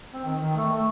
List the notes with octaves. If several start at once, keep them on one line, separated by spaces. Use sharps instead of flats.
C4
D#3
D#3
A3
A3